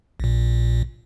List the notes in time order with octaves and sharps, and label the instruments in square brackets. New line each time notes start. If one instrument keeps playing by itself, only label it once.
[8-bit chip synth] A#1 A#2